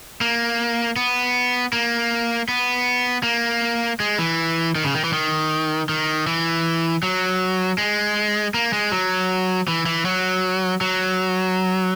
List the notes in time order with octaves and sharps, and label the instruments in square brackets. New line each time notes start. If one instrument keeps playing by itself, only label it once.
[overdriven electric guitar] A#3
B3
A#3
B3
A#3
G#3
E3
D#3
C#3
D#3
E3
D#3
D#3
E3
F#3
G#3
A#3
G#3
F#3
E3
E3
F#3
F#3